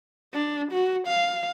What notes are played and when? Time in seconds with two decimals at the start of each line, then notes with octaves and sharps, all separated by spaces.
0.33 D4
0.72 F#4
1.07 F5